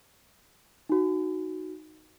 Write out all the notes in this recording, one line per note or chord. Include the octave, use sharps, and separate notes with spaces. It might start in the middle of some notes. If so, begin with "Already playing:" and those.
D#4 F#4